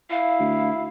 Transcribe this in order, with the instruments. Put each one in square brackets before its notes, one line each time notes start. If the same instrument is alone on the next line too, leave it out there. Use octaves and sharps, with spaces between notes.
[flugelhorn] E4 [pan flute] F5
[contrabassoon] D2